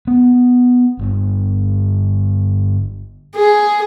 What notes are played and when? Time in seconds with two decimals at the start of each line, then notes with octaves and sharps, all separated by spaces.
0.07 B3
0.99 G1
3.36 G#4